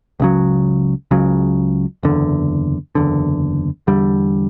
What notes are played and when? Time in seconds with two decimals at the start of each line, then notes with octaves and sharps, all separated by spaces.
0.20 C#2 C#3 F#3
1.11 C#2 C#3 F#3
2.03 F#1 E2 D3
2.95 F#1 E2 D3
3.87 E2 D3 G3